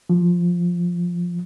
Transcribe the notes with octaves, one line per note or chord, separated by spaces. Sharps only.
F3